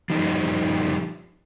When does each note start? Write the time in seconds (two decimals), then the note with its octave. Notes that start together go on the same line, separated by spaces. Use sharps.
0.10 F3 G3 D#4